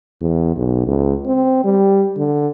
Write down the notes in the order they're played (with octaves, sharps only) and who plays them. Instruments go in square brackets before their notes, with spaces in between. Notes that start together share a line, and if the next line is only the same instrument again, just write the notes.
[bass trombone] E2
B1
C#2
C4
G3
D3